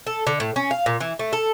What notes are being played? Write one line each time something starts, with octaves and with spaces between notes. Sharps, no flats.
A4
D3
A2
C#4
F5
A#2
E3
A3
A4